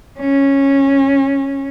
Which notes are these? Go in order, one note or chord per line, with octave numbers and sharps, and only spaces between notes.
C#4